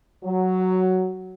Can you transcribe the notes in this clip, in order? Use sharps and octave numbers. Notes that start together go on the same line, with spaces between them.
F#3